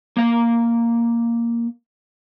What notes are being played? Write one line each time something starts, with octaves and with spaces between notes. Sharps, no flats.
A#3 F5